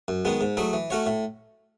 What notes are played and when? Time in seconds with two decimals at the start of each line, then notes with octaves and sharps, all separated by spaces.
0.08 F#2
0.25 D#3 G#3 B3
0.41 G#2
0.57 F#3 A3 E4 G#4
0.73 E3
0.90 A3 C#4 F#4 C#5
1.06 A2